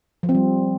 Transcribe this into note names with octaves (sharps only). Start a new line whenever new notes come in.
F3
C4
G3